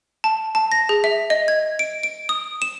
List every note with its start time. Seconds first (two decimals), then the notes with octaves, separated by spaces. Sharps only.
0.24 A5
0.55 A5
0.72 A#6
0.89 G#4
1.04 E5
1.30 D#5
1.48 G#6
1.79 D7
2.03 D7
2.29 D#6
2.62 E7